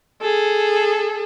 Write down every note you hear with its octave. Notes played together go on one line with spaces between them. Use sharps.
G#4 A4